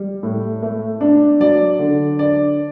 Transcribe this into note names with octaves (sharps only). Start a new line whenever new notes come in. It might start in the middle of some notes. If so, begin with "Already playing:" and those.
Already playing: G3
A2
A3
D4
F#3 D5
D3
D4 D5